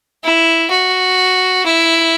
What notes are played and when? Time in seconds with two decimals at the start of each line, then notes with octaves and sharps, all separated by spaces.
0.24 E4
0.70 F#4
1.66 E4